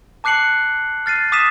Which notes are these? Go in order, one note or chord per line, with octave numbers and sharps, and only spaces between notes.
A5 D6 F#6 C7 C#7 F#7
F6 A6 C7 D#7
D6 D#6 A6 B6 D#7 E7